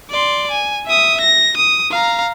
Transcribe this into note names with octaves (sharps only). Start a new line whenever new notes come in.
D5 C6
G#5
E5 D#6
A#6
D#6
F5 A#5